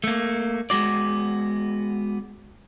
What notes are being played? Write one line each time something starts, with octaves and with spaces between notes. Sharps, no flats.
A3 A#3
G#3 B3 F#4 D5